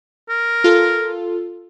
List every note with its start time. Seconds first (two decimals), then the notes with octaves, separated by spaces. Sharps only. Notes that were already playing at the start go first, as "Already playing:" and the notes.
0.29 A#4
0.64 F4 A4